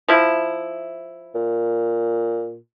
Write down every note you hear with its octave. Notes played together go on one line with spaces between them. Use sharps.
F3 E4
A#2